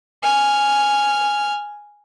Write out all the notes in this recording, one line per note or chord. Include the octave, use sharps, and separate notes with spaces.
G#5 F6